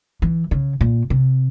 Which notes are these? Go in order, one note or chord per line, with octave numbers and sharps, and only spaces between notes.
E3
C#3
A#2
C3